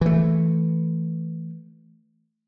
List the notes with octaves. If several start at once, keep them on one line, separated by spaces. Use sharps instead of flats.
E3 A3